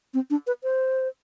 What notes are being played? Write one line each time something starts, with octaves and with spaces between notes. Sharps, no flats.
C4
D4
B4
C5